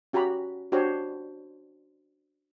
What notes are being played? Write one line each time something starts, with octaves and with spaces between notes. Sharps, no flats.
C#4 F#4 G4 A#5 B5
D4 F#4 G4 C5 C#5